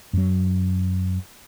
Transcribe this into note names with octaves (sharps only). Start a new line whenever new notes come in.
F#2 F#3